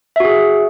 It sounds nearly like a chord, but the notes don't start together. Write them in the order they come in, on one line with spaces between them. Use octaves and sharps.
E5 F#4 G#4